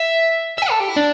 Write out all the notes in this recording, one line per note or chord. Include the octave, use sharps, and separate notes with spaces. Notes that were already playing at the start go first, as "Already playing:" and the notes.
Already playing: E5
E5
G5
A4
G4
E4
D4